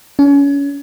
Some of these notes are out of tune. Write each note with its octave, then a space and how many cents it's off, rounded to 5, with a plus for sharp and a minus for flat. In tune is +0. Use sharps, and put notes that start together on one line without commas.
C#4 +30